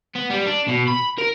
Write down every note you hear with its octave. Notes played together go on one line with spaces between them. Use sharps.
B3
G3
D4
B2
B5
A#4